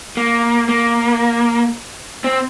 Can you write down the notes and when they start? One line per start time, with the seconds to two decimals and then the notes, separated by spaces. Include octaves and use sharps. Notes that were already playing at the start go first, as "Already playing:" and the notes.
0.17 A#3
0.69 A#3
2.24 C4